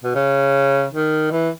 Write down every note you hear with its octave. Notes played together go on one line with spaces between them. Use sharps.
B2
C#3
D#3
E3